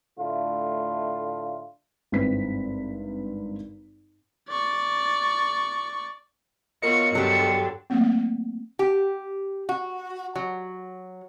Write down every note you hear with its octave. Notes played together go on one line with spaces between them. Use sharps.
A2 D3 A3 F4
G#1 G2 C4 E4 B4 B6
D5 C#6
B3 F4 F#4 A#4 C#5 D#5 C#7
G2 D3 F#3 D4 G4
F#3 A3 A#3 C4
G4
F#4
F#3